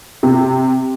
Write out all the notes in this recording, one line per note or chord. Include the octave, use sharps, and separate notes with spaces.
C3